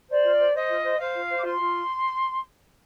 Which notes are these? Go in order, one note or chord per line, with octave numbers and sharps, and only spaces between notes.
C5 D5
F4
C5
C5 D#5
F4
C5
C5 F5
F4
C5
D6
F4 C6
F4